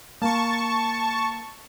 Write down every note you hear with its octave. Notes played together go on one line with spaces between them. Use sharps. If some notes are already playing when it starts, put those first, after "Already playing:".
A#3 A5 C#6